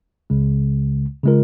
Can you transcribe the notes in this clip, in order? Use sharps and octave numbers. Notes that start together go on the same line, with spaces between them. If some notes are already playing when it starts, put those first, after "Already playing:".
C#2 C#3 G#3
C#3 G#3 F4 A#4